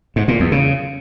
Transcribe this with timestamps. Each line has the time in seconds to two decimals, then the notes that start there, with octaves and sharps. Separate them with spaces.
0.16 G#2
0.28 A#2
0.40 E2
0.52 C#3